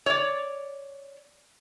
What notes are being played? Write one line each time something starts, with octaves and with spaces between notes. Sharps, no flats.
C#5 D5